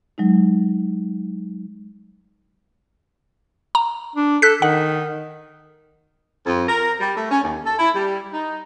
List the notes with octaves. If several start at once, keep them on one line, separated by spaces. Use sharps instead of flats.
F#3 G#3 D#4
A#5
D4
A4 F#6 B6
D#3 F#5
F2
A#4
G3
A3
C#4
D#2
A4
E4
G3
D#4